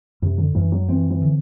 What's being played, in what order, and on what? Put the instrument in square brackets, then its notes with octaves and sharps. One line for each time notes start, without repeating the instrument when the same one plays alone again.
[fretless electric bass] F#2 [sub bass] C3
[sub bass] D3
[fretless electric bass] F#2 [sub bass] E3
[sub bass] F#3
[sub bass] E3 [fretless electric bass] C4
[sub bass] E3
[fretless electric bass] D3